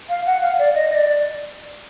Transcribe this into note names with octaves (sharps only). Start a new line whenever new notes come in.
F5
F#5
F5
D5
D#5
D#5
D5